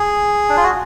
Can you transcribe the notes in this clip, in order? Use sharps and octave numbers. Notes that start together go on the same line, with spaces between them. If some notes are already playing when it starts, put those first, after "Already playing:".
Already playing: G#4
D4
F4
F#4